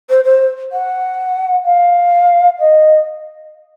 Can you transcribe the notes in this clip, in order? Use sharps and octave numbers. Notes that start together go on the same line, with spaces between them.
C5
C5
F#5
F5
D#5